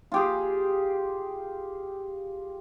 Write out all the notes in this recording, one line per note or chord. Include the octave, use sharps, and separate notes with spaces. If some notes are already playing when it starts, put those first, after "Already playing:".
F4 G4 G#4